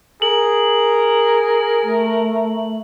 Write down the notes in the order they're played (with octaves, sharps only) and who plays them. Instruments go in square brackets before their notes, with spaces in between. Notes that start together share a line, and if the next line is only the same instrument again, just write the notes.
[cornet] G#4 [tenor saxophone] A#4 [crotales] F#7
[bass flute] A3